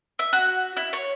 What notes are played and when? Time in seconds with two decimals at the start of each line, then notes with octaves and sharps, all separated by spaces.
0.19 E5
0.33 F#4
0.77 E4
0.93 C#5